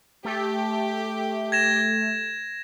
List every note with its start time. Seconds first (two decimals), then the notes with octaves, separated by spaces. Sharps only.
0.25 A3 G4
1.52 G#6 A#6 E7